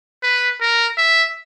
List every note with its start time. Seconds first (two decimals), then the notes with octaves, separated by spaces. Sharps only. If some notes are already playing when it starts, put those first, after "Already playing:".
0.23 B4
0.61 A#4
0.98 E5